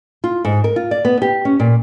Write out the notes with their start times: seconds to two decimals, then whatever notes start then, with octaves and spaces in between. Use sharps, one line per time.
0.24 F4
0.45 G#2
0.64 A#4
0.76 F4
0.91 D5
1.05 B3
1.22 G4
1.45 C#4
1.60 A#2